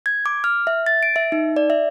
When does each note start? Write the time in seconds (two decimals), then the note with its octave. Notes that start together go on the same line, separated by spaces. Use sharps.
0.06 G#6
0.26 D6
0.44 F6
0.67 E5
0.86 A6
1.03 D7
1.16 E5
1.32 D#4
1.56 D5
1.70 E5